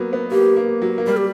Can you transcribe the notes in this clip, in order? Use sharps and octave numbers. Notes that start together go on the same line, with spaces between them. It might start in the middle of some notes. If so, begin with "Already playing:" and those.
Already playing: F#3 A#3 B3
B3
A#3 G4
A#3
F#3
A#3
G3 A#4
G4